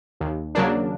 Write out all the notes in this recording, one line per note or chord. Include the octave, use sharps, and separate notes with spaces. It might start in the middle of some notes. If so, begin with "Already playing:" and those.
D#2
C#3 F#3 A#3 D4